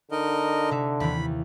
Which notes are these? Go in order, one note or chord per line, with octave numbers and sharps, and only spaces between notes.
D3 D#4 A#4 D#5
C3 D#4 E5
D#2 E3 B5